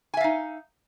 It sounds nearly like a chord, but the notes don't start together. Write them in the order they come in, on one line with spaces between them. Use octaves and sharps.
G#5 E5 F5 D#4